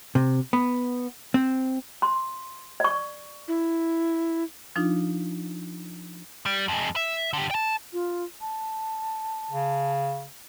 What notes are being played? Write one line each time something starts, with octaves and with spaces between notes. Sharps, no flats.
C3
B3
C4
C6
D5 C#6
E4
F3 D4 D#4 F4
G3
F2 G#3
E5
D3 G4
G5 A5
F4
A5
C#3